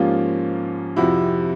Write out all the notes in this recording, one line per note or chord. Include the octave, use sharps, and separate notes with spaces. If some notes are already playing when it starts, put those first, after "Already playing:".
Already playing: G#2 F3 A#3 C#4 F4 G4
F2 C3 F3 E4 F#4